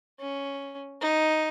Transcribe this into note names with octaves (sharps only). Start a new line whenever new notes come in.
C#4
D#4